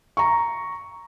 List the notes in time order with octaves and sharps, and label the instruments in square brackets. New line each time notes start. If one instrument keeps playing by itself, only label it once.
[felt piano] A#5 C#6